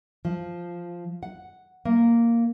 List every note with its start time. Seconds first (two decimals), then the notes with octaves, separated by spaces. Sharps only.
0.25 F3
1.23 F#5
1.85 A#3